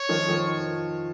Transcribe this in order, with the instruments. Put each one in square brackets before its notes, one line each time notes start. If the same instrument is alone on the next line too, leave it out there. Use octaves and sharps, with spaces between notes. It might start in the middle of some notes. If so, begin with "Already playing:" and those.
Already playing: [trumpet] C#5
[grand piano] D#3 F3
D#3 F3